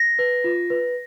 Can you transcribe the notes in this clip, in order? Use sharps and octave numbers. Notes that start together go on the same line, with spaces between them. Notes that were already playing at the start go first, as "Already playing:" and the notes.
Already playing: A#6
B4
F4
B4